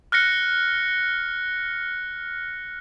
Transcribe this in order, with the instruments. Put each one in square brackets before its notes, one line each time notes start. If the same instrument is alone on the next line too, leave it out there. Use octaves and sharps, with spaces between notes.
[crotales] F6 F#6 A#6 C#7